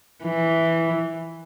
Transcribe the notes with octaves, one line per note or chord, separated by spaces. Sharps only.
E3